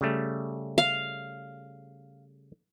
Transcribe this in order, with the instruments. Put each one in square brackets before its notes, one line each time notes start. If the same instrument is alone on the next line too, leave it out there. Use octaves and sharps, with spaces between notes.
[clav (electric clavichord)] C#3 G3 A3
[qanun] F5